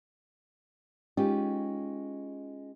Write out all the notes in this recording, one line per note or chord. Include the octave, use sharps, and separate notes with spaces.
G#3 C#4 D#4 F4 G4